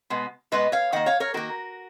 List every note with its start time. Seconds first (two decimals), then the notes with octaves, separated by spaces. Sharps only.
0.10 B2 G#3 B3
0.52 B2 G#3 B3 B4 D#5
0.72 C#5 F5
0.92 D#3 A#3 D#5 F#5
1.06 C#5 F5
1.20 A#4 C#5
1.34 D#3 A#3 F#4 A#4